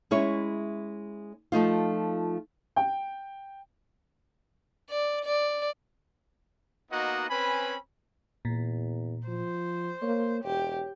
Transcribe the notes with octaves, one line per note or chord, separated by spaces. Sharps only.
G#3 C#4 E4 C#5
F3 A3 D#4 F4
G5
D5
D5
A#3 B3 D#4 F#4 D#5 F#5
C4 C#4 B4 G#5 B5
E2 A#2
F3 C5
A#3 C#5
E1 G4